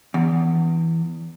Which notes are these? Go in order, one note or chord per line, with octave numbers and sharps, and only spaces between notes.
E2